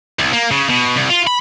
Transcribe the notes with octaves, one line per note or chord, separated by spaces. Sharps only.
C2
A#3
C#3
B2
C2
F4
B5